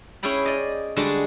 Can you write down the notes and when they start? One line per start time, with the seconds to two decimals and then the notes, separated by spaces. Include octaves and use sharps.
0.23 C#4 E4 G#4 G5 B5
0.46 D5 D#5
0.96 D3 G3 G#3 D4 F#4 G#4